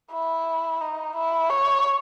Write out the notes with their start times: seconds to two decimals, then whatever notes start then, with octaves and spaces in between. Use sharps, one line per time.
0.11 E4
0.81 D#4
1.15 E4
1.50 C#5